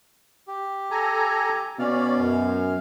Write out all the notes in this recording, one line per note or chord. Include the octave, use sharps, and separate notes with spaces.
G4
A4 G#5 A#5
B2 C#4 D5 F5
F#2